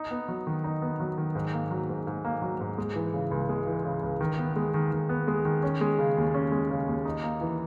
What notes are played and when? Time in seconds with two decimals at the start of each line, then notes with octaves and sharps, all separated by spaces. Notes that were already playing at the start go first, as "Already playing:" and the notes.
Already playing: D#4
0.11 B3
0.28 F#3
0.47 D#3
0.64 D#4
0.82 B3
1.00 F#3
1.18 D#3
1.35 G#2
1.53 A#3
1.71 F#3
1.89 G#2
2.07 G#2
2.25 A#3
2.42 F#3
2.60 G#2
2.78 G#3
2.96 E3
3.14 C#3
3.31 C#2
3.49 G#3
3.67 E3
3.85 C#3
4.03 C#2
4.21 D#3
4.38 B3
4.56 G#3
4.74 D#3
4.92 D#3
5.09 B3
5.27 G#3
5.45 D#3
5.63 C#4
5.81 G#3
5.99 C#3
6.17 D#2
6.34 C#4
6.52 G#3
6.70 C#3
6.88 D#2
7.05 D#4
7.23 A#3
7.41 E3